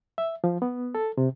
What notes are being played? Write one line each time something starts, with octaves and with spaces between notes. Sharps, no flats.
E5
F3
B3
A4
C3